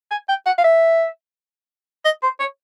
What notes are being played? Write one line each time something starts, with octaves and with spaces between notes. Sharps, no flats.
G#5
G5
F#5
F5
E5
D#5
C5
C#5